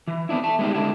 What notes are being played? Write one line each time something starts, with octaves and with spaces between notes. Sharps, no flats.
E3
B3 C4 D4 E4
E5 A5
G#3 B3 D4 D#4 G4
D3 G#3 D4 E4